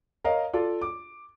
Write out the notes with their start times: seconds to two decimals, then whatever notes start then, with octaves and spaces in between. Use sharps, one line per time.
0.24 A#4 C#5 D#5 F5
0.53 F4 A4 D5 F5
0.81 D6